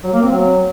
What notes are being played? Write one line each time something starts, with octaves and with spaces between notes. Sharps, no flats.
F#3
A#3
C4
F#3